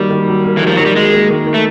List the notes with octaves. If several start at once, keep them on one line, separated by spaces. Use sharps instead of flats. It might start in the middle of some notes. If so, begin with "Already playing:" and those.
Already playing: D#3 F#3 G3 A#3
D#3
F#3
A#3
E3
D#3 F3
D#3 F#3
G3
F#3 G#3
A#3
D#3
D#3
A3